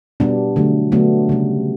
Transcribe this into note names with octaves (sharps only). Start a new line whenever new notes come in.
B2 G3 B3 D4
D3 F#3 A3
D3 F#3 A3 B3 D4
C#3 G3